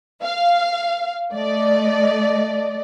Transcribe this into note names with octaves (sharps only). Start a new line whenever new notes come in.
F5
A3 D5 D#5